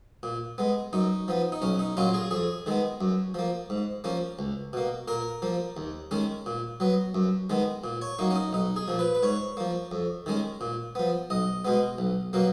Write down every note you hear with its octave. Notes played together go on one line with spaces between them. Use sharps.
A#2
G#3 B3
F#2 D#4
F3 B3
D#4
B1 C#4
D#4
A#2 F#3 C#4 F4
G#4
F2 G#4
D#3 G#3 B3
F#2
F3 A#3
G#2
F3 A#3 C#4
C#2
B2 A#3
A#2 A#4
F3 A#3
D#2
D#3 G#3 C#4
A#2
F#3 B3
F#2
D#3 G#3 B3
A#2
C#5
F#3 A#3 D#4
C#4
D#4
B1 D#4
G#4
A#2 F3
B4
B4
G#2 C#5
F3 A#3
F2
D#3 G#3 C#4
A#2
F3 B3
B1 D#5
B2 G#3 B3
B1
B2 F#3 A#3